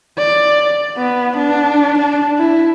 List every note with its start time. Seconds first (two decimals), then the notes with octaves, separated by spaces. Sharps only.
0.18 D5
0.97 B3
1.37 D4
1.98 D4
2.38 E4